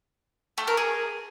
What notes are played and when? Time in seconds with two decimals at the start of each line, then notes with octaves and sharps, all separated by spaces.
0.58 A3
0.67 A#4
0.77 G#4